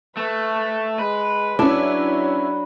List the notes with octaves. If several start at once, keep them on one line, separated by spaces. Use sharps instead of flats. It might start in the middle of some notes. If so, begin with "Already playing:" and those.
A3 B4
G#3 B4
F#3 C#4 D4 E4